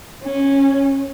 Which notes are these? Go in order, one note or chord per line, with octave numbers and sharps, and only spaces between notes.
C#4